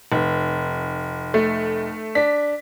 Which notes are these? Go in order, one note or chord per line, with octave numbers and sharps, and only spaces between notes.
F1
A3
D4 B6